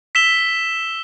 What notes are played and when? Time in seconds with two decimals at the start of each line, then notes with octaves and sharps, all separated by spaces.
0.15 E6 B6 E7 G7